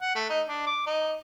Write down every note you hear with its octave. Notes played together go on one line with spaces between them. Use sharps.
F#5
A3
D#4
D4
D6
D#4